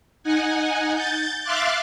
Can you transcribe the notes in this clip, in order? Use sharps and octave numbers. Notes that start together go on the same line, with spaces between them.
D#4 F#5 G#5
G6 A6
E5 F5 C6 D6 F#6 A6